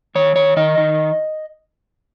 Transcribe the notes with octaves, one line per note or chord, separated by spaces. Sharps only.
D#3 C#5
D#3 C#5
D#3 D#5
D#3